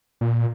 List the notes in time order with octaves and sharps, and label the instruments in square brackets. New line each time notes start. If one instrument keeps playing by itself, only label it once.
[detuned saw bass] A#2